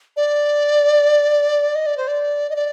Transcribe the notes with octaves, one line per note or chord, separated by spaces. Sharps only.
D5
D#5
D5
C5
D5
D#5
D5